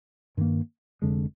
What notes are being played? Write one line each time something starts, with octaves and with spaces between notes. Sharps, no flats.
G2 D#3 A#3
F1 F2 D3 G#3